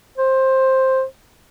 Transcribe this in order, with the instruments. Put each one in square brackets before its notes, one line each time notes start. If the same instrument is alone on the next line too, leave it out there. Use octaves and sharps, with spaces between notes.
[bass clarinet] C5